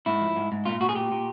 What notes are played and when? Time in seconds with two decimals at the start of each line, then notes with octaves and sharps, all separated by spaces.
0.06 G#2 E4
0.21 F3
0.36 G#2
0.52 G#2
0.65 A#2 F4
0.81 A#2 F#4
0.89 G#4
0.95 A#2 G4
1.12 A#2